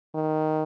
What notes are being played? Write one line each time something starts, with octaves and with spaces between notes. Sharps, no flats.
D#3